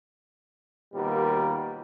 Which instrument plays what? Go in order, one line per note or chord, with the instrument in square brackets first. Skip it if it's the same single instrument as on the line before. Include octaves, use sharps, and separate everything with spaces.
[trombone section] D#2 B2 G3 F4 A#4